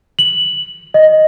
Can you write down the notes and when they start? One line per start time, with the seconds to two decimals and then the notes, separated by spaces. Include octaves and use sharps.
0.19 F#7
0.94 D#5